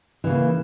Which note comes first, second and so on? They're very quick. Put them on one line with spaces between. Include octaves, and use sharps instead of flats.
E3 C#3 A#3